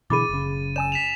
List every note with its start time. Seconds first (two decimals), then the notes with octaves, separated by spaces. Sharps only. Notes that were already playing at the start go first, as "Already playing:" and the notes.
0.10 B2 D3 E3 G#4 B5 D6 A6 D#7
0.29 F#1 C#3
0.76 C#5 G#5 E6 E7
0.92 B6 E7 F7